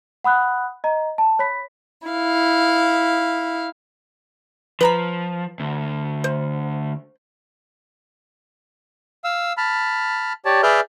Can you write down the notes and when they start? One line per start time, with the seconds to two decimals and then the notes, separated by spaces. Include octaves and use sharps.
0.24 F#5 B5 D#6 F#6
0.84 D#5 A#5
1.18 A5
1.39 C#5 B5 B6
2.08 E4 F5
4.81 F3 B4 A#5 B5
5.60 D2
6.24 C5
9.24 F5 E6
9.57 A5 B5 F6
10.45 G4 C#5 D5 A5
10.63 G#4 B4 D5 E5 F6 G6